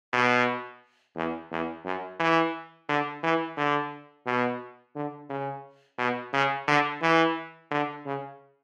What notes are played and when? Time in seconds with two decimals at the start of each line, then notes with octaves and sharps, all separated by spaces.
0.13 B2
1.16 E2
1.51 E2
1.85 F#2
2.20 E3
2.89 D3
3.23 E3
3.57 D3
4.26 B2
4.96 D3
5.29 C#3
5.98 B2
6.33 C#3
6.68 D3
7.02 E3
7.71 D3
8.05 C#3